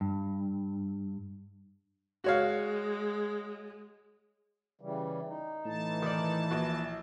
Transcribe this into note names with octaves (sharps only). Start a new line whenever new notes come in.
G2
G#3 F#4 C#5 F5
C#3 E3 G3
D#4
A2 E3 A5
D#3 D5
A#1 A#2 F#4